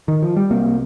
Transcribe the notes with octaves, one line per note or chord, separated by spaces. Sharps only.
D#3
F3
G3
C2 C3 A#3